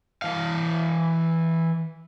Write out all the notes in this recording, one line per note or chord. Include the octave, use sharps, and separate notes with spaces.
E3 F5